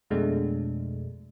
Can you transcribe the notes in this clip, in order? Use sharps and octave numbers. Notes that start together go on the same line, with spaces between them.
F2 B2 G#3 A3 D4